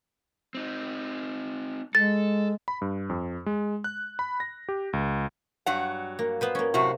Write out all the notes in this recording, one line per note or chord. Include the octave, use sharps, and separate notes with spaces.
C4 D#4
G#3 A4 A6
B5
G2
F2
G#3
F#6
B5
A#6
G4
C#2
G2 F#3 F#5
A#3
B3 B4 C5
A#3 C#4
F#2 A2 C3 F#4